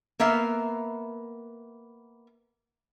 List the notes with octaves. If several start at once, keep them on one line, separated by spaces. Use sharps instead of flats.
A#3 B3 E5 F5